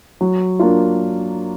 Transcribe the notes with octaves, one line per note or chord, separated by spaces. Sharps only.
F#3
A#3 D4 F4